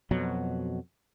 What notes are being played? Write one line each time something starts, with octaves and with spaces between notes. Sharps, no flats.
F2 B2 F#3